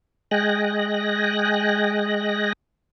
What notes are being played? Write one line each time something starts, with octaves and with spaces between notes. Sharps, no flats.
G#3 D#5 G5 G#5 F#6 A#6